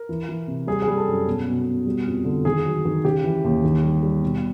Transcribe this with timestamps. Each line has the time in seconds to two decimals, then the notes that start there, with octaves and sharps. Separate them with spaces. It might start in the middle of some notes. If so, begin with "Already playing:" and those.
Already playing: A#4
0.09 E3
0.29 E3
0.47 C3
0.67 G3 G#4
0.82 G#4
0.88 G3
0.98 A4
1.08 F#2
1.27 B2
1.47 B2
1.66 B2
1.87 G3
2.06 F2
2.25 D3
2.45 D#3 G#4
2.65 F#3
2.85 D#3
3.04 C#3 G4
3.24 E3
3.44 D#2
3.64 D#3
3.83 G3
4.03 G3
4.22 B2